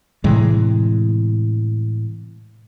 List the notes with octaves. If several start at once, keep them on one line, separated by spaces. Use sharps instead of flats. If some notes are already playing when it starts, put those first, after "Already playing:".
A2 C3 E3 G#3